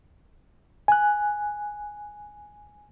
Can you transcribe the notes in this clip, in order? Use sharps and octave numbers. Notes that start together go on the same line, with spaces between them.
G#5 F#6